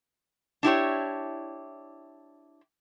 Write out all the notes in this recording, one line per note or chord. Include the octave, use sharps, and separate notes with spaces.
D4 E4 G4 C#5